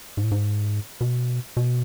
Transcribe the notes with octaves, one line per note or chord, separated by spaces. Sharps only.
G#2
A2
G#2
B2
B2